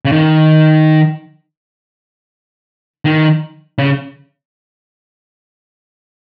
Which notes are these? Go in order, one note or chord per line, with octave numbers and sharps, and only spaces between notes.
C#3
D#3
D#3
C#3